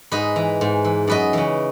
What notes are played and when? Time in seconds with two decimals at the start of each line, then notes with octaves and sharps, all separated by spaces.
0.12 G#2 B4 D#5
0.36 E3
0.61 G#2
0.85 E3
1.07 F#2 B4 D#5
1.33 C#3 E3